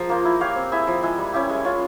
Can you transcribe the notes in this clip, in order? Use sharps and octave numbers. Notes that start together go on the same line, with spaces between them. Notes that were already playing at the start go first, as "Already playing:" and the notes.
Already playing: F3 G#4 A#4
A#3 F4 C5
E4
G4 C#5 F5
C4
E4 G#4 E5
F3
G#3 E4 G#4
G3
C#4 E4 G4
G#3
C#4 F4